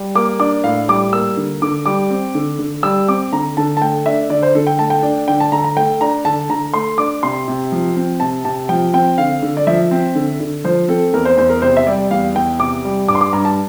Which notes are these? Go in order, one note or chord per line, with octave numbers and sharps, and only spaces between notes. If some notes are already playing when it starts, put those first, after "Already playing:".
Already playing: G3
A#3 D6
D4 D6
A2 F5
G3 D6
A#3 E6
D3
D3 D6
G3 D6
C4
D3
D3
G3 E6
C4 D6
D3 A#5
D3 A5
A5
A3 G5
D4 E5
D3 D5
C5
D3 A4
G5
A3 A5
G5
D4
D3 G5
A5
D3 A#5
A#5
A3 G5
D4 A#5
D3 A5
D3 A#5
A3 C6
D4 D6
C3 C6
C3
F3
C4
C3 A5
C3 A5
F3 G5
C4 G5
D3 F5
D3
D5
F3 E5
C4
D3
D3
F3 C5
C4 A4
E2 A#4
C5
E2 C5
A#4
C3 C5
E5
G3 D5
E2 F5
E2 G5
C3 D6
G3
G2 D6
C6
D6
G2 A#5
A5